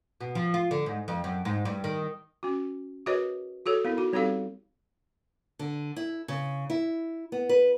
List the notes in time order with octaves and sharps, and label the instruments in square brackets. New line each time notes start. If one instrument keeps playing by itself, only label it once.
[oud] B2
F3
F4
D3
G#2
F2
F#2
G#2
G2
D#3
[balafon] C#4 F#4
F#4 G#4 A#4 B4 C#5 D#5
F#4 G#4 A4 C#5
B3 E4 A#4
D#4 F#4
G3 C4 D#4 G4 A4 F5
[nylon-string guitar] D3
E4
C#3
E4
B3
B4